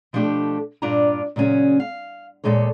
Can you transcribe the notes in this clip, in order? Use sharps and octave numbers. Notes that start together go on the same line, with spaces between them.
B2 F3 A3 D4 G4 A4
G2 A#2 D4 F4 D5 A#5
A#2 C#3 F#3 C#4 G#4
F5
E2 G2 A#2 G#3 A4 C#5